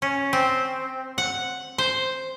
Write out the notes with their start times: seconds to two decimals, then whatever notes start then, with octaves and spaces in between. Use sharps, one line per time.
0.02 C#4
0.33 C4
1.18 F#5
1.78 C5